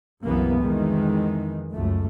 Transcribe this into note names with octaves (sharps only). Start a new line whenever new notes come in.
C2 F#2 C3 E3 A#3 B3
F2 D#3 E3 G#3
C#2 F#2 A3